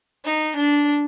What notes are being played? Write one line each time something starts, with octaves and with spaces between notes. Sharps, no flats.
D#4
D4